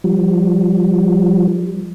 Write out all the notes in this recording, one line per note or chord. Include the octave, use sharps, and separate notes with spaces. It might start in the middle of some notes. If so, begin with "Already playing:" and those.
F3 G3